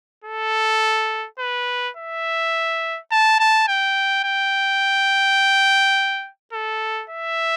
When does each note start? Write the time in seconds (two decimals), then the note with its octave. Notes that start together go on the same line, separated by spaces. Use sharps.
0.24 A4
1.39 B4
1.97 E5
3.11 A5
3.39 A5
3.68 G5
4.24 G5
6.53 A4
7.10 E5